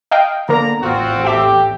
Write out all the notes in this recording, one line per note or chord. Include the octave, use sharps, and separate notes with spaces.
D#5 F5 G5
D3 A#3 B3 D4 A#5
A1 E2 C4 F4 F#4
G4 A4 E5 G5